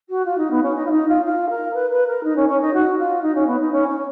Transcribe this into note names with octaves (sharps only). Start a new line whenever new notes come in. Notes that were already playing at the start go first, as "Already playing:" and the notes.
F#4
F4
D#4
B3
C#4
D#4
F4
D#4
F4
F4
A#4
B4
B4
A#4
D#4
C#4
C#4
D#4
F#4
F4
D#4
C#4
B3
D#4
C#4
C#4